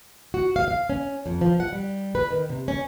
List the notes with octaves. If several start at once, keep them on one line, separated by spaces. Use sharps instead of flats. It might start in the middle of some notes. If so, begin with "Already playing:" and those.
F#4
F5
F5
C#4
F2
F3
F#5
G3
B4
D#3
C3
C#4